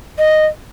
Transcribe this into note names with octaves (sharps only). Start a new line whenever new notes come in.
D#5